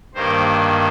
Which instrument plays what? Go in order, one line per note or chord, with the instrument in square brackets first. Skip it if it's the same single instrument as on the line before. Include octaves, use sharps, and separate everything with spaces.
[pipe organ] G2 D#3 A#3 C5